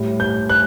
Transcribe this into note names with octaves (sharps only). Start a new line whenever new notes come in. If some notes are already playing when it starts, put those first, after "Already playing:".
Already playing: A2 G3
G6
F#6